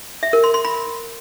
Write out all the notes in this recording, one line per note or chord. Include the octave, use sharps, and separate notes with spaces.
E5
A#4
C6
C6
B5